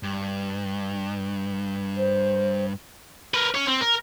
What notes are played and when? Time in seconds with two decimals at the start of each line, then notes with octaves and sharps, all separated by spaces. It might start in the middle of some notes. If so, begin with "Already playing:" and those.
0.03 G2
1.97 C5
3.34 A#4 B4
3.55 C#4 C#5
3.67 C4
3.81 A#4